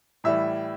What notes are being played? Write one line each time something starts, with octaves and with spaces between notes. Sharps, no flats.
A2 E3 G3 E5